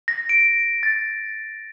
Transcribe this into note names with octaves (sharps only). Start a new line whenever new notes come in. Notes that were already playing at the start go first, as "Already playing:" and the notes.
A#6
D7
A6